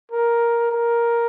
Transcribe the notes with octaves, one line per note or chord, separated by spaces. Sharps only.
A#4
A#4